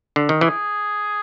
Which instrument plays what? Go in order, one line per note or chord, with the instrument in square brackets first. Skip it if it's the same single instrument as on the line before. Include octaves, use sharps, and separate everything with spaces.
[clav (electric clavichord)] D3
D#3
[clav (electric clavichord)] E3 [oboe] G#4